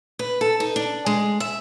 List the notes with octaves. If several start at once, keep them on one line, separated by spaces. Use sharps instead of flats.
B4
A4
D#4
D4
G#3
E5